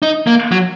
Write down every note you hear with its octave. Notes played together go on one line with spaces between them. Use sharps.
D#4
A#3
F#3